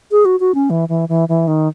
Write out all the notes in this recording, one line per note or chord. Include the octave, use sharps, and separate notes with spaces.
G#4
F#4
F#4
C#4
E3
E3
E3
E3
D#3